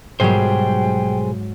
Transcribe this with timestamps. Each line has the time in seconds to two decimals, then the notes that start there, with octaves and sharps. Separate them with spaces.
0.20 B1 G#2 F#3 G3 G#4 C5 G5